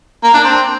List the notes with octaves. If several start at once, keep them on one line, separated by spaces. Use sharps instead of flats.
A#3
D4
C4